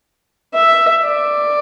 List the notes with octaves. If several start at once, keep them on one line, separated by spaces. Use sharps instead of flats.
E5
D5